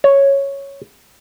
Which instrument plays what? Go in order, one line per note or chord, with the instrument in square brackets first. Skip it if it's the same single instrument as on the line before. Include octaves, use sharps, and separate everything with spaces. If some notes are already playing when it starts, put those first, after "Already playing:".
[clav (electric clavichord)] C#5